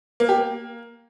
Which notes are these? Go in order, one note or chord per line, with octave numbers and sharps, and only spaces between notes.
A#3
G4
A#3